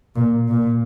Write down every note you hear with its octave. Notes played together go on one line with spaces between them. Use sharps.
A#2
A#2